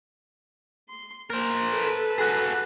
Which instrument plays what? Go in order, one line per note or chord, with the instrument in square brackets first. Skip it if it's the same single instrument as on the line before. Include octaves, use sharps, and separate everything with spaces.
[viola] C6
[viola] A#3 [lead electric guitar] A#4 C5
[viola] A4 B4
[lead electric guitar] F#4 G#4